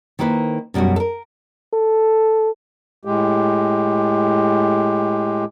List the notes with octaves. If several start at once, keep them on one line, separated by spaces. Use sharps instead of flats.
D#3 A#3 E4 B4 C5
F#2 B2 G3 C#4 F#4
A4 A#4
A4
A2 G#3 G4